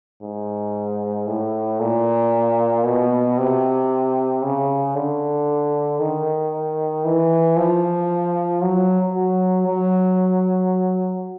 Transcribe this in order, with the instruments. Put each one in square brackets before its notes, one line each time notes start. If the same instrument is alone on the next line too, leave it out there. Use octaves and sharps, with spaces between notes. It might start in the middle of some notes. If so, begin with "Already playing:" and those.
[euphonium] G#2
A2
A#2
B2
C3
C#3
D3
D#3
E3
F3
F#3
F#3
F#3